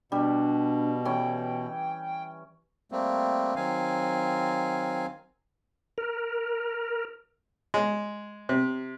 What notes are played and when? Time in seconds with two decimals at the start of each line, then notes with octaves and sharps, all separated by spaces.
0.12 B2 G3 D4
1.05 E3 C#4 G5
2.92 G3 A3 A#3 C4
3.56 D#3 F#3 C4 F5 G#5
5.98 A#4
7.74 G#3
8.49 C3